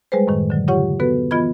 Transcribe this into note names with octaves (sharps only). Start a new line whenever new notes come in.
G3 G#3 G#4 B4 C5
F#2 A2 D#3
D3 F#3
C#3 F4 G4 C#5 F#5 C#6
B3 F#4 A4 B4
E3 B3 F4 D#5 B5 G#6